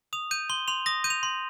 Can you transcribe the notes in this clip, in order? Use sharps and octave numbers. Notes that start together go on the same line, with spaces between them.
D#6 F7
G6 D#7
C6 G7
C6 F7
D#6 A#6
G6 D#7
F7
C6